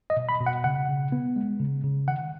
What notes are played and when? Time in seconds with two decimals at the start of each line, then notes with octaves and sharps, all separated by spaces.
0.10 D#5
0.17 B2
0.29 B5
0.41 B2
0.46 F#5
0.64 C#3 F#5
0.89 C#3
1.12 B3
1.36 G#3
1.60 C#3
1.84 C#3
2.08 D#3 F#5